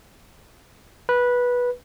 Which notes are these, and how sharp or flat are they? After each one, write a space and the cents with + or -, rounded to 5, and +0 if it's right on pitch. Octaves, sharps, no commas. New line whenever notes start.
B4 -15